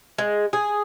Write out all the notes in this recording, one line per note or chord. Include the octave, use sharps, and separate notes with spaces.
G#3
G#4